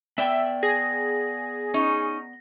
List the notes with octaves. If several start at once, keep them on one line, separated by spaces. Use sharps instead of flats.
B3 D5 E5 G5
G#4 A#6
C#4 D#4